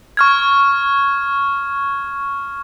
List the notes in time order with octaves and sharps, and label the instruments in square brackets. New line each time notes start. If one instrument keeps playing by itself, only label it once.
[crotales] C#6 F6 G#6